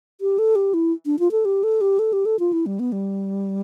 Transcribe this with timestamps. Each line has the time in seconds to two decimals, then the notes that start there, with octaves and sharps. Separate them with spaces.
0.21 G4
0.39 A4
0.56 G4
0.74 E4
1.06 D4
1.19 F4
1.31 A4
1.45 G4
1.63 A4
1.81 G4
1.99 A4
2.13 G4
2.25 A4
2.39 F4
2.53 E4
2.66 G3
2.79 B3
2.92 G3